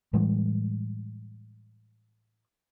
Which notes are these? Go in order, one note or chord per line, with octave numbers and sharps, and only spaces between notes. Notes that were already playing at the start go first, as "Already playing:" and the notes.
A2 E3 G3 G#3